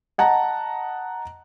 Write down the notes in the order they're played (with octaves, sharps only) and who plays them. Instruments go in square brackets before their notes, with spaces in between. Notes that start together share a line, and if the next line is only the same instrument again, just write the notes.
[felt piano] D#5 F#5 A5 A#5